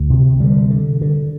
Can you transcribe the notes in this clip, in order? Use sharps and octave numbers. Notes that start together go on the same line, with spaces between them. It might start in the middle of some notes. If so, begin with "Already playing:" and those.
Already playing: D2
C3
D3 G3
D3
D3